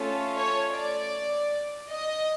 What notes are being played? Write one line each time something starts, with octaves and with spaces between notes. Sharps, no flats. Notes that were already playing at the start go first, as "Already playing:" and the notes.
Already playing: A3 C#4 F4 A4
C#5
D5
D#5